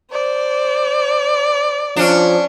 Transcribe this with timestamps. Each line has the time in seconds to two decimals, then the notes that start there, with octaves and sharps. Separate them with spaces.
0.12 C5 D5
1.96 F3 C#4 D4